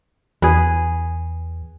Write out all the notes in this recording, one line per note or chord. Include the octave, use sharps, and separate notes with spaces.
E2 G#4 B4